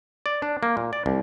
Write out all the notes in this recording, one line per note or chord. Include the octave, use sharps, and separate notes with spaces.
D5
D4
A#3
A#2
D5
C2